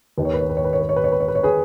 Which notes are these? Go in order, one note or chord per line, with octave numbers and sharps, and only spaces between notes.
D#2 D#3 B4
C#5
B4
C#5
B4
C#5
B4
C#5
B4
C#5
B4
C#5
B4
C#5
B4
C#5
G#4 B4